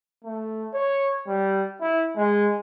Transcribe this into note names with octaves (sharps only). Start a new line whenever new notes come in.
A3
C#5
G3
E4
G#3